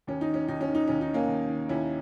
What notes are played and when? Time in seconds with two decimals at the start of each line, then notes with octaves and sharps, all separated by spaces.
0.07 D#2 C#4
0.21 D#4
0.28 D#3
0.34 C#4
0.48 D#2 D#4
0.61 C#4
0.68 D#3
0.75 D#4
0.87 D#2 C#4
1.01 D#4
1.09 D#3
1.14 A#3 C#4
1.28 D#2
1.49 D#3
1.69 D#2 C#4 E4